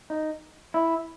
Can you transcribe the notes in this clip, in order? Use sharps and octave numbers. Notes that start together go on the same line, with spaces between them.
D#4
E4